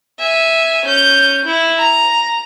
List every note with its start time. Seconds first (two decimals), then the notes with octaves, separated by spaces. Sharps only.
0.19 E5 G#5
0.85 C#4 G6
1.45 E4
1.79 A#5